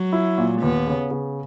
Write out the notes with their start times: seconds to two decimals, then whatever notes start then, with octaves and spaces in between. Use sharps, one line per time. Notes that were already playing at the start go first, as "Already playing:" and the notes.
Already playing: F#3
0.13 E4
0.38 A#2
0.62 D#2 B3
0.87 C#3
1.11 C#3